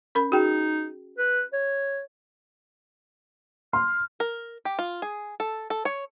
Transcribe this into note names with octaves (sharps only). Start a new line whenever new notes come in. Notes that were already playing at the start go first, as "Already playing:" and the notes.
C#4 A#4 B5
D#4 F#4 G#4 G5
B4
C#5
C6 F6
A#4
G4
F4
G#4
A4
A4
C#5